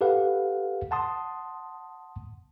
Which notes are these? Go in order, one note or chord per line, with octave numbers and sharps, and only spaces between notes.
G4 A4 B4 F5 F#5
F#5 A5 C6 D#6